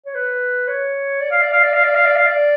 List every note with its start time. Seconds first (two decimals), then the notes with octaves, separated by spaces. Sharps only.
0.06 C#5
0.15 B4
0.67 C#5
1.21 D5
1.31 F5
1.42 D5
1.52 F5
1.63 D5
1.74 F5
1.84 D5
1.95 F5
2.06 D5
2.16 F5
2.26 D5